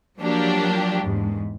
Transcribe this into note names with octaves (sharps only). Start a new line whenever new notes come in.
F3 F#3 A#3 D4 G4
E2 G#2